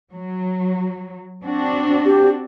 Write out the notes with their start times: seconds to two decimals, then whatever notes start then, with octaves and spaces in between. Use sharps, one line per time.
0.13 F#3
1.43 C4 D4 F#4
2.05 G4